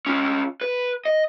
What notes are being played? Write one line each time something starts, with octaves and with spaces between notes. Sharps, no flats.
C#4 F4
B4
D#5